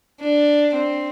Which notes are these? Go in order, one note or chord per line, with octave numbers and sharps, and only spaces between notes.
D4
C4